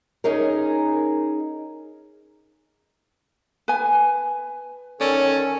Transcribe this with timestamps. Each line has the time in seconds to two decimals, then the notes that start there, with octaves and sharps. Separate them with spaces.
0.24 C#4 D#4 G#4 A#4
3.68 B4 G#5
5.01 D#3 C#4 A4 C#5 D5